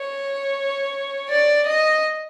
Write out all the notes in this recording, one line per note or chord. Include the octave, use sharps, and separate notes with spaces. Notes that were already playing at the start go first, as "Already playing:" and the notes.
Already playing: C#5
D5
D#5